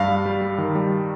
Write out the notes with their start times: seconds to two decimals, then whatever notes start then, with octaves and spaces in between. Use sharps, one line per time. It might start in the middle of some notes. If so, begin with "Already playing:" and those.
Already playing: G2 F5
0.08 G3
0.26 G3
0.42 G3
0.58 D#3
0.75 G3